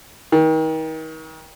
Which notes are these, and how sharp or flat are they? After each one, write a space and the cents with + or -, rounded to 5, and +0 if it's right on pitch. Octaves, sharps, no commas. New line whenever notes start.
D#3 +35